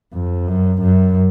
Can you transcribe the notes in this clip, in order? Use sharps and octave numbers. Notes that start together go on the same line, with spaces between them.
F2
F#2
F#2